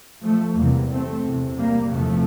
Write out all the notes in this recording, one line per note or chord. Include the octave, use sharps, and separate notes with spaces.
F3 A3
E2 C3 G3 A#3
A3 C4
E2 C3
G3 A#3
E2 C3 F3 A3